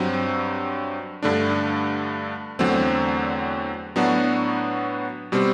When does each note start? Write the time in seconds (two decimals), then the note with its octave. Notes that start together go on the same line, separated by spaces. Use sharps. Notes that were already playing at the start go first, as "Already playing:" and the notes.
Already playing: G2 F#3 C4
1.23 G2 D3 A3 D4
2.59 E2 D3 F#3 A3 C4
3.96 A2 F#3 B3 D4 F#4
5.32 B2 G3 C4